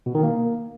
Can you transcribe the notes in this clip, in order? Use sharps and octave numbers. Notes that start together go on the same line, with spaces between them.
B2
D#3
A#3